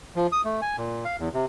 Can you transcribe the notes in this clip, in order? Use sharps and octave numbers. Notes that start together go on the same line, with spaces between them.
F3
D#6
A3
G#5
A#2
F5
E2
C3